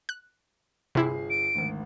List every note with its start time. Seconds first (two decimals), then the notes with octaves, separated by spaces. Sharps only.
0.09 F#6
0.95 G1 C3 E4 G#4 C7
1.30 D7
1.55 G#1 D2